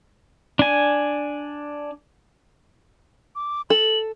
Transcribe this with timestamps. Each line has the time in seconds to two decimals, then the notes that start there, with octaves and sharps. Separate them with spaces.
0.59 D4 G#5
3.36 D6
3.70 A4 F#7